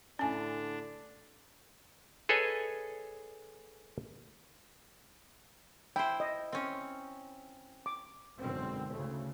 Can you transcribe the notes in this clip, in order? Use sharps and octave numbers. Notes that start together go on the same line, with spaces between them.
A2 D3 C#4 D4 G#5 A5
G#4 A4 B4 C#5 D#5 G#5
E4 C5 G5
D#5
C4 C#4
D6
G#1 F#2 B2 D3 C4
D2 C#3 A3